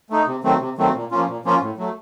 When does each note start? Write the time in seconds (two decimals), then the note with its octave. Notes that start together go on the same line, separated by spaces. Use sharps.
0.10 A3 D#4
0.27 C3
0.43 D#3 F#3 A3 C4
0.60 C3
0.78 D#3 F#3 A3 C4
0.95 A#2
1.11 F3 A#3 C#4 F4
1.28 A#2
1.45 F3 A#3 C#4 F4
1.61 A2
1.78 F#3 A3